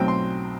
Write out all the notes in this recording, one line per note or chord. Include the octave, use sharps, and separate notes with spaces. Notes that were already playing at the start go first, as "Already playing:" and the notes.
Already playing: B1 B2 F#3 A3 C4 G5
C6